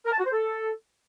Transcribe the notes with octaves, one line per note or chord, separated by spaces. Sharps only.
A#4
A5
F#4
C5
A4